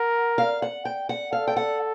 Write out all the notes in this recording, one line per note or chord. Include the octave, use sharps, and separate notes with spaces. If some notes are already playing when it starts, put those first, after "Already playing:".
Already playing: A#4 F#5
F5
F#5
G5
F#5
A4 F5
G5
F#5